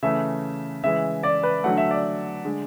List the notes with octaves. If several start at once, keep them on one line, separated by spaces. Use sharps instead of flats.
C#3 E3 A3 E5
C#3 E3 G#3 E5
D5
B4
D3 F#3 A3 F#5
E5
D5
D3 G#3